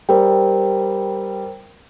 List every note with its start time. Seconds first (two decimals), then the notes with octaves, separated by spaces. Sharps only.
0.09 G3 A#4 C5 G5